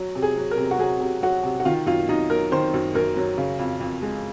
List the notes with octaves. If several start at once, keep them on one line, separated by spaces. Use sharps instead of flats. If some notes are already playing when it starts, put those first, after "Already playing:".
Already playing: F#3
C3
G#4
F#3
A#4
C3
F#4
F#3 G#4
C3
F#3 F#4
C3
F#4
D#3 F4
F#2 F4
F#2 D#4
F#3 A#4
D#3 C5
F#2
F#2 A#4
F#3
C#3
F2
F2
G#3